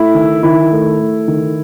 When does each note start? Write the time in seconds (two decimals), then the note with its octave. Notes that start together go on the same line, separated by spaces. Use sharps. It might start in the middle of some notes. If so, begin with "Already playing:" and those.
Already playing: A3 E4
0.15 D#3
0.43 D#3 E4
0.71 A3
1.00 A3
1.28 D#3